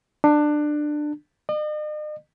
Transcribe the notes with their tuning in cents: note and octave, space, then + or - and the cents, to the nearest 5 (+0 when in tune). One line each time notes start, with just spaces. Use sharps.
D4 +20
D#5 -45